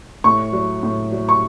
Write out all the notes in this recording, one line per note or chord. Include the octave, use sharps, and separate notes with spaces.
A2 C#6
F#3
A2
F#3
C#6